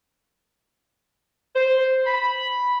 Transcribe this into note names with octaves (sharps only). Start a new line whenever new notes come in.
C5
B5